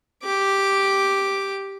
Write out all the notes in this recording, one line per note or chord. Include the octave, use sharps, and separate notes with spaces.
G4 D6